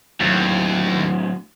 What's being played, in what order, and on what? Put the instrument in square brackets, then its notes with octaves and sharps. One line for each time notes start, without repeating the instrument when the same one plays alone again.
[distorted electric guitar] D#2 [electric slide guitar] A2 F#3